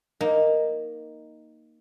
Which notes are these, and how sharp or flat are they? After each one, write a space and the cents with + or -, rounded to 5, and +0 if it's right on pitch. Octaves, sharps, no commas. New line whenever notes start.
A#3 +0 D#4 +0